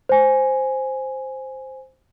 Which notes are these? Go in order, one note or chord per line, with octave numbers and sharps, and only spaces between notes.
C5 G#5